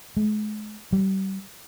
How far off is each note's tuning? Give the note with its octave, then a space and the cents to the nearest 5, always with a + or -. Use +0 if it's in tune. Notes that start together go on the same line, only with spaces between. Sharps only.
G#3 +40
G3 -30